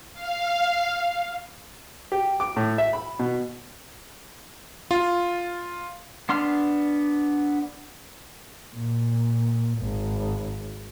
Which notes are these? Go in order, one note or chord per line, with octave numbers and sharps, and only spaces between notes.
F5
G4
D6
A2
E5
B5
B2
F4
B3 D4 C6 F6
A#2
G#1